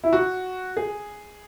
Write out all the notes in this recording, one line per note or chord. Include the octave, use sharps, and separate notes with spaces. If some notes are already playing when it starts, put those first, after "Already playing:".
E4
F#4
G#4